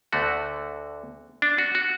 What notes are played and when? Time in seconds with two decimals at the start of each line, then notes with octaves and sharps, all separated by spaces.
0.13 D2 D3 A3 F#4
1.42 D4
1.58 F#4
1.75 F#4